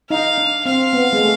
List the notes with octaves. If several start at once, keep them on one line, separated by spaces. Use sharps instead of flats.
D#4 F5
D4
C4 F5
B3
G#3
A3